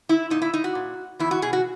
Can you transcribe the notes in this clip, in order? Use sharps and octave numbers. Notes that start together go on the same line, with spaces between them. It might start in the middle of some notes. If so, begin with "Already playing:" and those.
E4
A#2 D#4
E4
D#4
F#4
A#2
E2 E4
F#4
B2 G#4
F#4